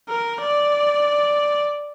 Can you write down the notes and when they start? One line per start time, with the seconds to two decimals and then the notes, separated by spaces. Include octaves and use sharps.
0.09 A#4
0.42 D5